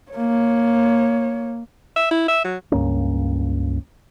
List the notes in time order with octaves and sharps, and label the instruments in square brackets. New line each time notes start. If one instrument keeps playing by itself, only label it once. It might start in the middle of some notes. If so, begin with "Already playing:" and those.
[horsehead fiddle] A#3 C#5
[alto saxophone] E5
E4
E5
F#3
[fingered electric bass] C#2 G2 A#3 C#4